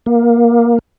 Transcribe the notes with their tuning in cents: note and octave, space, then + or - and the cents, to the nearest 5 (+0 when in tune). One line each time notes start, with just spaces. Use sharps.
A#3 +15